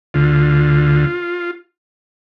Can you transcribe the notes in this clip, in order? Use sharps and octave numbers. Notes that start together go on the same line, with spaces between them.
D2 D3 F4